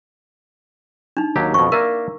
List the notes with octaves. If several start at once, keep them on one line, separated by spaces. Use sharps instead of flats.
D4 D#4
D#2 F#3 G4
F2 B2 C#6
A#3 A#4 D5 E5